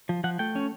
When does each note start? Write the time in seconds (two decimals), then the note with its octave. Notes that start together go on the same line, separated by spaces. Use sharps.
0.09 F3
0.24 F3 F#5
0.39 A3 G5
0.55 C#4